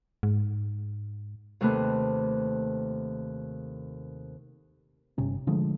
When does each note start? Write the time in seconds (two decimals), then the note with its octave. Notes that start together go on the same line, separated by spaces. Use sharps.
0.23 G#2
1.61 D#2 C3 A3 B4
5.18 G1 C3 C#4
5.47 D3 F3 G#3 A3